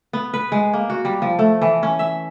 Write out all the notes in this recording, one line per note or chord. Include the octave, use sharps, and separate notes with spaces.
B3
B4
G#3
A#3
F#4
G3
F3
A3
E3
C#4
E5